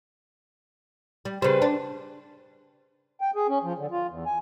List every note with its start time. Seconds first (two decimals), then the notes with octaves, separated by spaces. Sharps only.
1.25 G3
1.42 C#3 G3 B4 C5
1.62 D4
3.21 G5
3.36 G#4
3.49 C#4
3.63 F3
3.78 D3
3.91 F4
4.10 E2
4.26 G#5